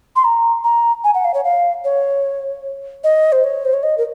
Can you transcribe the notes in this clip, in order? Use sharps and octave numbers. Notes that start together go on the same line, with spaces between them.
C6
A#5
A#5
G#5
F#5
F5
C#5
F5
C#5
D#5
C5
C#5
C5
C#5
D#5
A#4